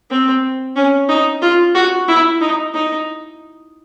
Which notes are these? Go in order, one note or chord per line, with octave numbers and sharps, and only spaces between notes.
C4
C#4
D#4
F4
F#4
E4
D#4
D#4